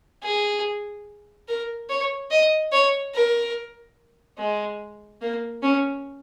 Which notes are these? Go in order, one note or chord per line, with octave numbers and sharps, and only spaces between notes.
G#4
A#4
C#5
D#5
C#5
A#4
G#3
A#3
C#4